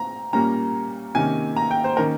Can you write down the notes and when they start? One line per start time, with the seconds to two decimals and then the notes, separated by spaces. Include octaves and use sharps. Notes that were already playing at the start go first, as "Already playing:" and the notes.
Already playing: C4 A#5
0.33 A#2 G3 A#3 C#4 A#5
1.15 C3 D#3 A#3 C#4 G#5
1.56 A#5
1.71 G5
1.84 C5
1.97 D#3 A#3 C#4 A#4